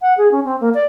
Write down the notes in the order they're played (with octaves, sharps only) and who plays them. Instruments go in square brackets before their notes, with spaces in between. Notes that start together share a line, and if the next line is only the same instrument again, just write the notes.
[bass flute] F#5
G#4
C#4
C4
A#3
D5